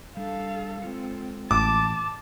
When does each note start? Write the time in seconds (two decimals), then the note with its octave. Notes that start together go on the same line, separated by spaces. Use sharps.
0.17 G3 D4 A4 F5
0.82 G#3 C4 F4 A4
1.51 A1 A5 D6